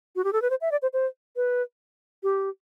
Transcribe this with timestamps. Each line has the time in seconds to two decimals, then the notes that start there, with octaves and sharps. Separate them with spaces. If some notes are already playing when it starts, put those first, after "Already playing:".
0.16 F#4
0.24 G4
0.33 A4
0.42 B4
0.50 C5
0.61 E5
0.71 D5
0.82 C5
0.93 C5
1.36 B4
2.23 G4